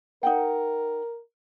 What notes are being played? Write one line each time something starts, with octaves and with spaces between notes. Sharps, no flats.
D#4 A#4 F#5 G5